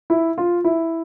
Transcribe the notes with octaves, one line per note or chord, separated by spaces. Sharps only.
E4
F4
E4